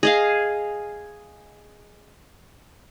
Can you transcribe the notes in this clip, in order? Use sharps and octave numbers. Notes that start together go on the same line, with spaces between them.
G#4 D#5 F5